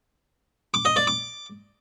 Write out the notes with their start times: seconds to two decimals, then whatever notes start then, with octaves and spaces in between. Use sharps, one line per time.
0.74 D6
0.85 D#5
0.96 D5
1.07 D6